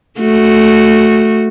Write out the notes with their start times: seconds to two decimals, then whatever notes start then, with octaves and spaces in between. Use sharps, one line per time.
0.20 A3 F#4